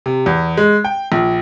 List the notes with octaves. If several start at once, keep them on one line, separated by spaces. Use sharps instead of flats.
C3
E2
G#3
G5
A#1